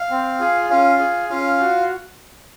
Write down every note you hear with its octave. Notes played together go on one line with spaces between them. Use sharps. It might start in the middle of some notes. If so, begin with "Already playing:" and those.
Already playing: F5
C4
F4 G#4
C#4 F4 F5
G#4
C#4 F4 F5
F#4